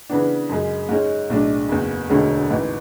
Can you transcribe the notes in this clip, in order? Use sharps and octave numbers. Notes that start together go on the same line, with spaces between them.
C#3 E3 B3 D4
F#2 C#3 G#3
G#2 G#3 C#4
B1 A2 G#3 D4
F#1 E2 C#3
E1 D2 D3 G#3 C#4
A1 G#2 E3